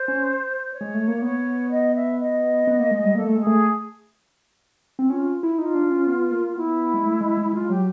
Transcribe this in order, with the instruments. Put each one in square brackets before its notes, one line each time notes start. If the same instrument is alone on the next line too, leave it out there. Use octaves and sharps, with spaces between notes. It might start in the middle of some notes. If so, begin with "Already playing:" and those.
Already playing: [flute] C5
[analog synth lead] C#4
[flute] C#5
[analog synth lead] G#3
A3
A#3
[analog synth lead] B3 [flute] C#5
[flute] D#5
E5
D#5
[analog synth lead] B3
A#3
G#3
G3
[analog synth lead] A#3 [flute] A4
[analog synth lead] A3
[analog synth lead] G#3 [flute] G#4
[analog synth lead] A3
C4
[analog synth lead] C#4 [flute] F4
[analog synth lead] E4
[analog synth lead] D#4 [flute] F4
[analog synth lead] D4
C#4
B3
A#3
[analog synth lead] B3 [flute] E4
[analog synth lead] G#3
A3
G#3
G#3
[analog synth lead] G#3 [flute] F4
[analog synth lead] F#3 [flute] G4